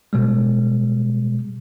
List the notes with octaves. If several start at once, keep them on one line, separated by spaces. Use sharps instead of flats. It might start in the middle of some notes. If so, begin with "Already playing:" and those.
B2 G3 G#3